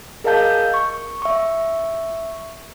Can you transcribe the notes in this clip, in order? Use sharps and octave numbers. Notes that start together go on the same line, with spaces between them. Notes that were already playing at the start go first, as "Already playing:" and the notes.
G#4 A#4 D#5 F5 A5 G6
C#6
E5 C#6